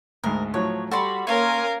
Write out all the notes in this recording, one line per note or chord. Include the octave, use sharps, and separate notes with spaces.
D2 G#2 A#4
A2 F3 F#3 C#5
G3 F#4 A4 D5 B5 C6
A#3 C#4 A#4 C#5 F5 G#5 C6